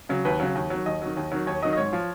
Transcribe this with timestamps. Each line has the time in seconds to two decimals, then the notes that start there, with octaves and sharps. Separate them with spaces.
0.09 C#3 F#3
0.25 D#2 B4
0.40 C#3 F#3
0.55 D#2
0.70 D#3 F#3
0.86 D#2 D#5
1.02 D#3 F#3
1.17 D#2
1.32 D#3 F#3
1.47 D#2 C#5
1.62 D#3 F#3 D#5
1.73 D#5
1.77 G#2 C#5
1.93 F3